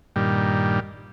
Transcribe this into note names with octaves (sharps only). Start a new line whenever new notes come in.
G2 A#2 D#3 G3